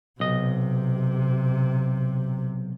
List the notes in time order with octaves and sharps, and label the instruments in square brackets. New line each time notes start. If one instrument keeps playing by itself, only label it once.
[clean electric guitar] B1 D#5 [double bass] C3